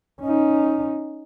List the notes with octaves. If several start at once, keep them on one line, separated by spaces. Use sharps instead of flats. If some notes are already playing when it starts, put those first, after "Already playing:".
C#4 D#4